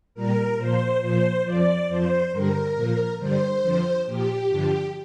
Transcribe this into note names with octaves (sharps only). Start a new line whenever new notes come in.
A#2 G3 A#4
A#2 F3 C5
A#2 F3 C5
F2 F3 D5
F2 F3 C5
G2 D3 G3 A#4
A#2 F3
G2 D3 G3 C5
F2 D3 F3
A#2 F3 G4
G2 D3 F3